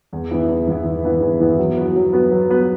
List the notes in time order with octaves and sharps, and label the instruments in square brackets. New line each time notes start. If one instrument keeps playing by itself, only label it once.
[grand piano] E2
E3 B3 E4
E2
E3 B3 E4
E2
E3 B3 E4
E2
E3 B3 E4
F#3
B3 F#4 B4
F#3
B3 F#4 B4
F#3
B3 F#4 B4